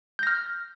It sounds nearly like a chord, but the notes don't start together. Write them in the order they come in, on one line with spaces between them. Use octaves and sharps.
G6 A#6 F6